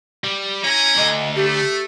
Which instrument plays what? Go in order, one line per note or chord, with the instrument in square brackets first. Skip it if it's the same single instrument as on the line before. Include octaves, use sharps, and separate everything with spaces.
[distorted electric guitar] G3
[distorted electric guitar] C#4 [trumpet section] E4 G#5 A#5
[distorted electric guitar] D2 D3 [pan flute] D#5
[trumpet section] A3 [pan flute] G4